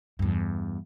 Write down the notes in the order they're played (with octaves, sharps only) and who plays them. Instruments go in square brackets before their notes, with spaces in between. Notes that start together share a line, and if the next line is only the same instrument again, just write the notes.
[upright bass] E2 G2